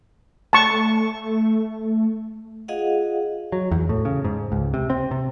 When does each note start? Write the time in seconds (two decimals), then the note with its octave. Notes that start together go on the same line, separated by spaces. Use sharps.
0.53 A3 A5 C#6
2.68 F4 G#4 D#5 F5 F#5
3.52 F#3
3.71 E2
3.89 A2
4.05 C#3
4.25 G#2
4.52 C#2
4.74 C3
4.90 C4
5.11 C3